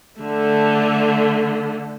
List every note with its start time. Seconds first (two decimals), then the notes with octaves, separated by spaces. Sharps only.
0.20 D3 A3